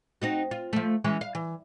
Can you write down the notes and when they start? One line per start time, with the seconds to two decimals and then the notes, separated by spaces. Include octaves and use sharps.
0.22 C4 D#4 F#4
0.51 F4
0.73 F3 A3
1.04 E3 G#3 C#4
1.21 F5
1.35 E3